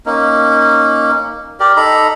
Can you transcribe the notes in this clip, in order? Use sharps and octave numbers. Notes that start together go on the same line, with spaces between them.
A#3 C#4 D#4
G4 A#4 D5
D#4 A4 A#5 B5